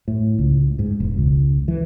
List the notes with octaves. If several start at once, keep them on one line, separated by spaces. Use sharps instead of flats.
A2
C#2
G#2
E1
C#2
E3